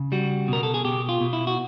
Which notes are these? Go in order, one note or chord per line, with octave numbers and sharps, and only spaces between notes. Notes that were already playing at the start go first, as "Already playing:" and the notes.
Already playing: C#3
G3 F#4
B2 A#4
A4
G#4
B2 G4
F4
B2
E4
F#4